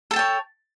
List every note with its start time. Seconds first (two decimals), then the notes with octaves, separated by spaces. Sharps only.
0.11 A4
0.13 A5
0.16 G5
0.19 C#5